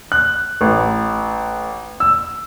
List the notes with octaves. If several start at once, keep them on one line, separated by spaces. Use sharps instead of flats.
F#6
A1
E6